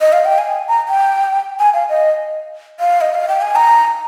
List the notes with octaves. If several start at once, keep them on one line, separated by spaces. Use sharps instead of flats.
D#5
F5
G5
G#5
A#5
G5
G#5
F5
D#5
F5
D#5
F5
G5
G#5
A#5